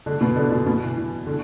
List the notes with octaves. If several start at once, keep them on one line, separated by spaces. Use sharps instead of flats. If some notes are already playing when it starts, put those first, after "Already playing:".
D3 D4
B2 B3
D3 D4
B2 B3
B2 B3
E3
E3
D3